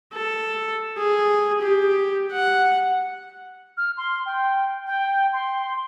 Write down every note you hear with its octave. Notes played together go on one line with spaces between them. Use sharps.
A4
G#4
G4
F#5
F6
C6
G5
G5
C6